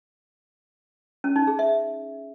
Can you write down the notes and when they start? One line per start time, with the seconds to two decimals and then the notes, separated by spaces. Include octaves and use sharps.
1.24 C#4
1.36 D#4
1.47 G#4
1.59 E5